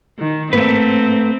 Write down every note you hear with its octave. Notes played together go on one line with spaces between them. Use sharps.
D#3
G#2 A3 A#3 C4 B4